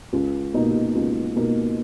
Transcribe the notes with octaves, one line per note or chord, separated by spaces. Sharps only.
C#2
B2 A#3 D#4
C#2
B2 A#3 D#4